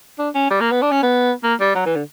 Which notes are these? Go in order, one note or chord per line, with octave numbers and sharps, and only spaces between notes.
D4
C#4
G3
A#3
B3
D4
C#4
B3
A#3
G3
F#3
E3
D3